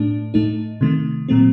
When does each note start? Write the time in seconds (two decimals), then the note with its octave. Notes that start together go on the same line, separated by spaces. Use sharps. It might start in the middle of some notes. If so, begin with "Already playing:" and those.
Already playing: A2 A3 D4
0.34 A2 A3 D#4
0.81 C3 D#3 A3
1.28 A#2 F#3 A3 C4